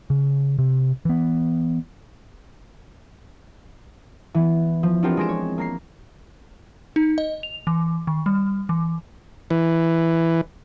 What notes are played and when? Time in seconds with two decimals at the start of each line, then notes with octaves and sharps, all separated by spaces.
0.10 C#3
0.59 C3
1.05 E3 B3
4.34 E3 B3
4.83 F3
5.03 B3 C4 D4 F4 G4 A#4
5.17 G#3 G#4 C6 A#6 D7 E7
5.29 C#5
5.58 A#3 A#5 C7
6.96 D#4
7.18 D#5
7.43 F7
7.67 E3
8.07 D#3
8.26 G3
8.69 E3
9.50 E3